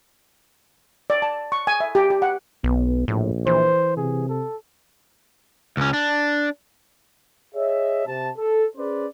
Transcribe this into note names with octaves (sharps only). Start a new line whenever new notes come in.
D5
A5
C#6
G#5
E5
G4
G4
F#5
B1 B3
A#1 A2
E3 C5
C3 G#4
A4
C#2 C#4
D4
G#4 C#5 D#5 E5
C3 A5
A4
C#4 G#4 B4 C5 D5